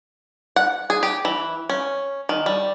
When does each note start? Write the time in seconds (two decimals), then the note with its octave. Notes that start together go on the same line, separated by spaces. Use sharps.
0.56 F#5
0.90 G#4
1.03 G4
1.25 E3
1.69 C#4
2.29 D#3
2.46 G3